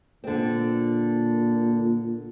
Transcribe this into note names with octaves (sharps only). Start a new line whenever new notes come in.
A#2 D3 C4